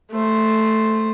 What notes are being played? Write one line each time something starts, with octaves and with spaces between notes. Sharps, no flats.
A3 C5